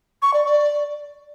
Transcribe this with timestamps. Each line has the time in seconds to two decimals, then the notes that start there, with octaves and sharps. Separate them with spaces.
0.22 C#6
0.34 D5
0.45 D5